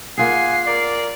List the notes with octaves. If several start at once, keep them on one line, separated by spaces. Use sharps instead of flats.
A#3 F4 G#4 F#5 G#5 C7
A#4 D5